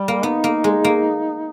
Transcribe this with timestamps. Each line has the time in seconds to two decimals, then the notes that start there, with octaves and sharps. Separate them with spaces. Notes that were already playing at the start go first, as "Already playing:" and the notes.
Already playing: G3
0.08 A#3
0.23 B3 D#4
0.44 A#3
0.64 G#3
0.84 A#3